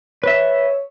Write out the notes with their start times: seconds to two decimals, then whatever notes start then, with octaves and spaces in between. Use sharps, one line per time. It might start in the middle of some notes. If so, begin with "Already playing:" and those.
0.24 B4 C#5 E5